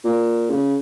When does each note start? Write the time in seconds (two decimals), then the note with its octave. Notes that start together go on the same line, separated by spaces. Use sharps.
0.04 A#2
0.50 C#3